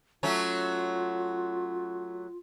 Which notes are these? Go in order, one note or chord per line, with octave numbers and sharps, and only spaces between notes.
F#3 A3 C#4 F4